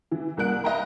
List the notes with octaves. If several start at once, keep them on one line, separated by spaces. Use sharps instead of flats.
E3
C2 A#3 F#5 F#6 D7
D#5 F5 G5 A#5 B5